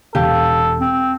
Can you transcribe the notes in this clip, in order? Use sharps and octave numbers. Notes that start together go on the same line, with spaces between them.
E1 G4 A4 F5
C4